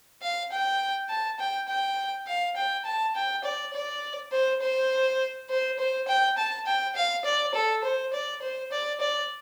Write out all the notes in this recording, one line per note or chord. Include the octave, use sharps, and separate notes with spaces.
F5
G5
A5
G5
G5
F5
G5
A5
G5
D5
D5
C5
C5
C5
C5
G5
A5
G5
F5
D5
A4
C5
D5
C5
D5
D5